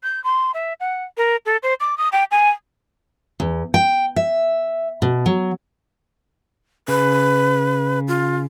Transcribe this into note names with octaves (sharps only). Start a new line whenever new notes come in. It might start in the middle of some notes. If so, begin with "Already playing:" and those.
G6
C6
E5
F#5
A#4
A4
C5
D6
D#6
G5
G#5
E2
G5
E5
B2
F#3
C#3 B4
F4